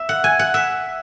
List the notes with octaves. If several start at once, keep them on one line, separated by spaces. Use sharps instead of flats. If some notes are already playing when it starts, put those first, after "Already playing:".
Already playing: E5
F#5
G#5
F#5
E5